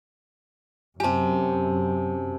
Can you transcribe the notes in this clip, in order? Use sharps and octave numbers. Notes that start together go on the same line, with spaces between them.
F#2 C3 G4 G#5 A5